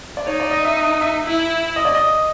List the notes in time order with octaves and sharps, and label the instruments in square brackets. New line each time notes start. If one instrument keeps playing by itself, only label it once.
[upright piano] D5
[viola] D#4 [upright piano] C#5
[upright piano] D5
D#5
E5
D#5
E5
[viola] E4 [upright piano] E5
[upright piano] D#5
D5
D#5